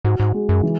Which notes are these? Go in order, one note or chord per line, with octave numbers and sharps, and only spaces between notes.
G#2 F#4
G#2
G#3
F#2
E3